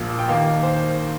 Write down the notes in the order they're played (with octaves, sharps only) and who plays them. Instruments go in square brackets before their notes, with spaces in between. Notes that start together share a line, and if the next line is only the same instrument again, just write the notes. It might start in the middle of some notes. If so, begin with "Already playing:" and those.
Already playing: [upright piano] A#1 A#2 F3 A#3
G5
D#2 D#3 A#3 F5
C5